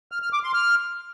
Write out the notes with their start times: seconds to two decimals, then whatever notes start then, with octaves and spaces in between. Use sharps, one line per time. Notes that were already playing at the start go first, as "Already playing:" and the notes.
0.12 F6
0.22 F6
0.33 D6
0.43 C6
0.54 F6